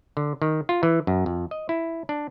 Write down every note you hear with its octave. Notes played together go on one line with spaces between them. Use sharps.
D3
D#3
F4
E3
F#2
F2
D#5
E4
D4